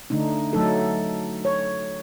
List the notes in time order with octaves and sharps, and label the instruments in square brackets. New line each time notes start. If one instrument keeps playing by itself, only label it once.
[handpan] D3 A3 D4 D#4
F#3 A3 D#4 A4
C#5